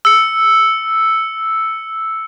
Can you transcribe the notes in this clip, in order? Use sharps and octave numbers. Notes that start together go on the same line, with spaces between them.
E6 C#7